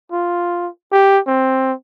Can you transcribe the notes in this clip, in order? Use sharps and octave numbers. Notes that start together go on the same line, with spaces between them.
F4
G4
C4